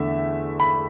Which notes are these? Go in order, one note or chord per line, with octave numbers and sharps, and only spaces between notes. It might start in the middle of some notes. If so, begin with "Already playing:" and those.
Already playing: E2 D3 A3 E5
B5